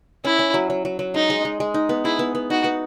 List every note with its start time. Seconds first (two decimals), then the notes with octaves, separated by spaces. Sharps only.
0.25 C#4 E4
0.39 C#4
0.54 F#3
0.70 F#3
0.85 F#3
0.99 F#3
1.14 G#3 D#4
1.30 G#3
1.45 G#3
1.60 G#3
1.74 D#4
1.89 B3
2.05 E4 G#4
2.19 B3
2.35 B3
2.50 D#4 F#4
2.64 B3